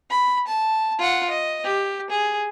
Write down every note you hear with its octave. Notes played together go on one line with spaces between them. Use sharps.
B5
A5
F4 F#5
D#5
G4
G#4